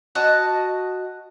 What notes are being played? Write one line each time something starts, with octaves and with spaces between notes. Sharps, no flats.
F#4 D#5 A5